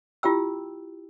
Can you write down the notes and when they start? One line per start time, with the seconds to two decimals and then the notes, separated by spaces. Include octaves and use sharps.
0.23 E4 F4 G4 G5 E6